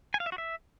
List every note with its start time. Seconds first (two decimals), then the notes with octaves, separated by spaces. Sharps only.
0.14 G#5
0.20 F5
0.26 E5
0.32 F#4
0.38 E5